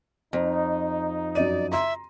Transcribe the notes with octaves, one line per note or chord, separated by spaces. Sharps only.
F2 D#4
F#2 D5 D#5 D#7
E5 A#5 C6